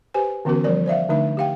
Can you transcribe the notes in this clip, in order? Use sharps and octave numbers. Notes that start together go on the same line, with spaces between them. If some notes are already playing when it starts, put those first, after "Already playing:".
G4 B4 C5 G#5
D3 E3 B3 C#4 F#4 A#4
F3 G3 A#4 D5
C5 D5 E5 F5
D3 A3 D4 D#4 E5
G4 F5 G5